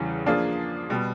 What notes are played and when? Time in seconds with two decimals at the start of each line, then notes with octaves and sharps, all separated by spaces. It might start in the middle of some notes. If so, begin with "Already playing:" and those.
Already playing: E2 C#3 E3 G3
0.26 F3 A#3 D4 F4 G#4
0.90 B2 G3